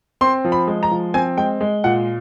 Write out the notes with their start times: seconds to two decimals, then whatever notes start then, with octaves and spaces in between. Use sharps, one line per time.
0.21 C4 C6
0.45 F3
0.52 B5
0.67 G#3
0.83 A#5
0.91 F3
1.14 C4 G#5
1.37 G#3 G5
1.61 G#3
1.84 A#2 F#5